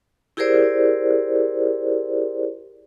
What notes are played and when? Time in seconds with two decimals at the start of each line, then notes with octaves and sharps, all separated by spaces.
0.37 E4 G4 G#4 A#4 C5 D5